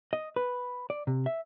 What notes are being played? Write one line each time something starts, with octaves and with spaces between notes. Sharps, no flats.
D#5
B4
D5
C3
E5